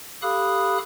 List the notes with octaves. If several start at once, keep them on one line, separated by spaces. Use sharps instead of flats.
G4 A4 F5 B5 D#6 F#6